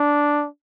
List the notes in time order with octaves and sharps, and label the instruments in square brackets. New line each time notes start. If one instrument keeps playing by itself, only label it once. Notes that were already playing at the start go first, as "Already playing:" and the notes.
Already playing: [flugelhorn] D4